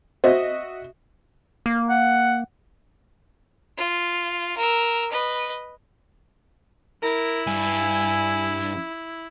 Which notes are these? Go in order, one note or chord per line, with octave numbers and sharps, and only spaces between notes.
F#4 C5 D#5 E5
A#3
F#5
F4
A#4 E6
B4 D#5
E4 A#4
G2 G#5